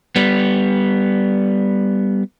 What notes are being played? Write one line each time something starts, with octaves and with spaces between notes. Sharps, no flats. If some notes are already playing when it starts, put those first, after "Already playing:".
G3 B3